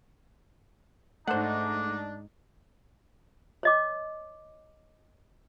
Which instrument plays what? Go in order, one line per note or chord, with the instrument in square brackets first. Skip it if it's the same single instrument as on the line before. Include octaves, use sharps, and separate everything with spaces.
[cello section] G#2 D#4 [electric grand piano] A3 [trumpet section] D4 [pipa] C5 F#5
[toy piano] C#5 D#5 D6